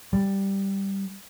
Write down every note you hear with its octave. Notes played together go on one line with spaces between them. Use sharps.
G3